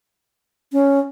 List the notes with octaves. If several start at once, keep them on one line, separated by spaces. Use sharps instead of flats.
C#4